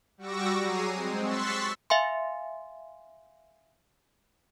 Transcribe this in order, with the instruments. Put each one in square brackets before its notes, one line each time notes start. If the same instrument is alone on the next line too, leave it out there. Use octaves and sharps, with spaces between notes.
[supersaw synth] G3 F#4 C#6 D6 E6 A#6
F#3 G#4 A#5 C7 D#7
G#3 C4
C6 C#6 E6 F#6 A6 B6
[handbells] E5 F5 G#5 C6